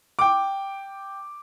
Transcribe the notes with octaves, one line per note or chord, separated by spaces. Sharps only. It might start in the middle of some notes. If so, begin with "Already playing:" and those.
G5 D6